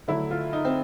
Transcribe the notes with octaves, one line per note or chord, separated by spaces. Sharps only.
D3 F#3 A3 E4
F4
D#4
C4